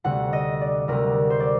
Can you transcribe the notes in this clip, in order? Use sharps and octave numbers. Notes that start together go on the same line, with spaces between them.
D2 C3 G3 F#5
D#5
D5
D2 C3 G3 A#4
C5
D5